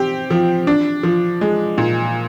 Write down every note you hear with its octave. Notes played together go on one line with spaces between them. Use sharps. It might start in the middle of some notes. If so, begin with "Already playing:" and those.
Already playing: C4 G4
F3
D4
F3
G#3
A#2